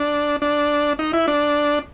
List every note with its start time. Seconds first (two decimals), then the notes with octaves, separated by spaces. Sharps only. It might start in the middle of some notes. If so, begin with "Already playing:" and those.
Already playing: D4
0.42 D4
0.99 D#4
1.13 E4
1.28 D4